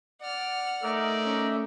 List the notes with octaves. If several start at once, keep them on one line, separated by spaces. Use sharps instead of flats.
D5 F#5 F6
A3 D#4 A#4 D5 E5
C#4